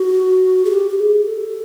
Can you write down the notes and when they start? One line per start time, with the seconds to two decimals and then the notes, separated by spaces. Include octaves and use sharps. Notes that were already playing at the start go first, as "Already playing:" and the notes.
Already playing: F#4
0.65 G#4
0.71 G4
0.89 G4
0.98 G#4
1.25 A4